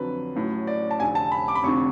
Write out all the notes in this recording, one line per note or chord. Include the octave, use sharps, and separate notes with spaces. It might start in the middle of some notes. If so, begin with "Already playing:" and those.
Already playing: F2 D3 F#3 B4
A1 A2 F#3
D5
A5
F1 F2 D3 G#5
A5
B5
D6
B5
F1 F2 D3 C#6